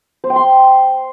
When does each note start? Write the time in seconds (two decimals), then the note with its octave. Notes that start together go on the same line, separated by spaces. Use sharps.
0.24 C5
0.30 G5
0.36 C6